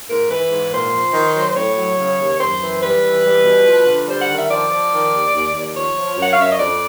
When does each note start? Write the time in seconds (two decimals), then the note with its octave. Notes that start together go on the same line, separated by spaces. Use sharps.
0.09 G#2 A#4
0.29 E3 B4
0.50 G#2
0.71 A#2 C5
0.93 F3
1.14 D#3
1.35 F#3
1.55 A2 C#5
1.77 F#3
1.98 C#3
2.19 D#2
2.39 F#2 C5
2.60 E3
2.81 G3 B4
3.03 E3
3.24 G3
3.45 B2
3.66 F3
3.86 D3
4.07 G3 C5
4.22 F#5
4.29 D#3
4.36 E5
4.50 F3 D5
4.70 F3
4.92 D#3
5.13 D#2
5.34 D#2
5.54 D#2
5.75 F3 C#5
5.96 F3
6.18 F#2 F#5
6.32 F5
6.38 F#2 E5
6.50 D#5
6.59 F2 D5